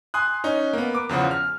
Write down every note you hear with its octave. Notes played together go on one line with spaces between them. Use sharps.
G#5 C6 D#6 F#6
C#4 D#4
A#3 B3
D6
E2 C#3 F3 F#5
F6